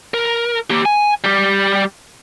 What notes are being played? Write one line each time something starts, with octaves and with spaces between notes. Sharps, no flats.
A#4
A#3 G4
G#5
G3 G4